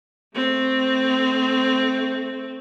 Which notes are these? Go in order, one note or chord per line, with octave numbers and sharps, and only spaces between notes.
A3 C4